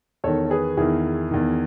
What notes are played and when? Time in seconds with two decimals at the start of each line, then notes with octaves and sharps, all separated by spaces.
0.24 E2 D#3 A4 C#5
0.45 A4
0.50 G#4 B4
0.77 E2 D#3 E4 G#4
1.31 E2 D#3